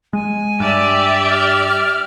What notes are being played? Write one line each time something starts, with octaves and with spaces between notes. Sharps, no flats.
G#3 G#5
G2 G4 D5 E5
F6